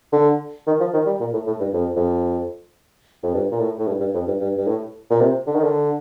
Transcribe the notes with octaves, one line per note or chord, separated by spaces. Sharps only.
D3
D#3
F3
D#3
G3
A#2
A2
A2
G2
F2
F2
F2
G2
A#2
A2
A2
G2
G2
F2
G2
G2
G2
A2
A#2
C3
D3
D#3
D3